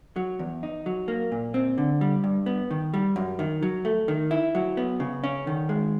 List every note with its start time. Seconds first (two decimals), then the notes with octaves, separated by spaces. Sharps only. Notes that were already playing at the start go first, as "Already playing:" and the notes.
0.16 F#3
0.39 E2
0.63 D#4
0.86 F#3
1.08 A#3
1.32 A#2
1.54 C4
1.78 D3
2.01 G3
2.24 G2
2.46 B3
2.71 D#3
2.94 G3
3.16 F#2
3.39 D#3
3.63 F#3
3.85 A3
4.08 D#3
4.31 E4
4.55 F#3
4.77 B3
5.00 C#3
5.24 C#4
5.47 D#3
5.69 G#3